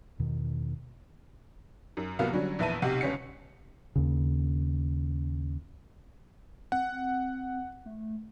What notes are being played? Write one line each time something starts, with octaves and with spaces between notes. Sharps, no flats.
E2 B2 D#3
F#2
C2 F#2 F#3 A#3 B3 F5
D3 F#3 G3 C#4
A#1 E2 B4 E5 A5 D#7
B1 C3 G4 F#5 C7
G1 C#2 C#4 B6 C#7
D#2 C#3
C4 F#5
A3